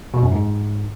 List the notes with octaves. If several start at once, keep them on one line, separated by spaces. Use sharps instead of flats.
B2
F#2
G#2